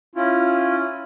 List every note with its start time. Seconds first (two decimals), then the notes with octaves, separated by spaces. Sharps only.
0.15 C#4 E4 F4